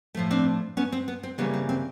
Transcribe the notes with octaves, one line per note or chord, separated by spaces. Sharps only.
A2 F3 A3
C4 D4
B3 C#4
C4
B3
C4
C#3 E3 G3 A#3 B3
C4
C4